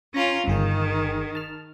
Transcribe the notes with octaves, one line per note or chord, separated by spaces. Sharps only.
C#4 F4 A#5 A#6
G1 D#3 G#4 G5
A5 F6